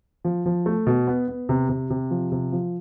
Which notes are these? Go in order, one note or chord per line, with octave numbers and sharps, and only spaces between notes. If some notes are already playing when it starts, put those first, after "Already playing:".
F3
F3
A3
B2
B3
B3
C3
C3
C3
F3
C3
F3